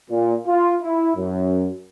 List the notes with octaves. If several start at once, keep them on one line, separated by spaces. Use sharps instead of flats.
A#2
F4
E4
F#2